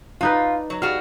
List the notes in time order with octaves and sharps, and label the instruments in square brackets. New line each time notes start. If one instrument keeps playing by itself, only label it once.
[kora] D4 D#4 B4 [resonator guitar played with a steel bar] F4
[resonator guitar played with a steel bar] F#3
[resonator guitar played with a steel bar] G3 F#4 G#4 [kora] F5